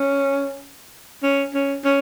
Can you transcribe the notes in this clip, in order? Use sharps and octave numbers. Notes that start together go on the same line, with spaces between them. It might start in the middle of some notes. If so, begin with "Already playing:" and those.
Already playing: C#4
C#4
C#4
C#4